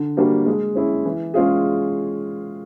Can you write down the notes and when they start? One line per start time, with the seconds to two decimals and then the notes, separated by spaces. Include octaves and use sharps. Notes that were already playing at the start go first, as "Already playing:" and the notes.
Already playing: D3
0.17 G3 A#3 D4 F#4
0.46 G#3
0.75 C#4 E4 G#4
1.06 E3
1.34 G#3 C#4 F4 G#4